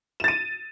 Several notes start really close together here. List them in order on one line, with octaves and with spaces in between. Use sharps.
E7 A6 D#7